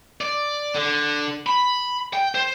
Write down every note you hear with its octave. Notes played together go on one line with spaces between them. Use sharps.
D5
D3
B5
G5
C5